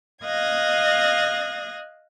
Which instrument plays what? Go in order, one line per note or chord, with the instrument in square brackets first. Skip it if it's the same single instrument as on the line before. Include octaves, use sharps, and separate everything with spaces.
[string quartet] D#5 F5 D#6 F#6 G#6 A#6